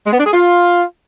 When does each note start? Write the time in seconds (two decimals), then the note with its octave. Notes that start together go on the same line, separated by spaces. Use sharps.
0.05 G#3
0.12 B3
0.19 D4
0.26 G#4
0.33 F4